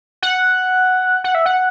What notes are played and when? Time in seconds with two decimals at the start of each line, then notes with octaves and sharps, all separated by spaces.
0.23 F#5
1.24 F#5
1.35 E5
1.46 F#5